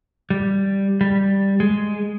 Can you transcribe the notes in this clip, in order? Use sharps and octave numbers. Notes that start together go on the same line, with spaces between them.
G3
G3
G#3